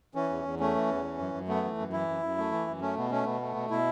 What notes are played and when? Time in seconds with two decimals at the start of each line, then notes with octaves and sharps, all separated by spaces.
0.15 E3 C#4
0.30 E2
0.45 E2
0.59 A3 C#4
0.75 E3
0.90 E2
1.05 E3
1.18 F#2
1.34 F#2
1.48 A3 B3
1.63 E3
1.78 F#2
1.92 E3 E4
2.08 F#2
2.23 F#2
2.38 A3
2.52 E3
2.68 F#2
2.81 A3 C#4
2.97 B2 B3
3.11 A3 C#4
3.26 B2 B3
3.41 A3
3.56 B2
3.70 B2 E4